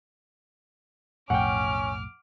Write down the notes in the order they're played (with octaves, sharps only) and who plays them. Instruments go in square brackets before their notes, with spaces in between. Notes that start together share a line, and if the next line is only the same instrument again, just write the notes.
[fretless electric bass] B1 F2 A2 [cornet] C#4 [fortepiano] F#5 G5 [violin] D6 F6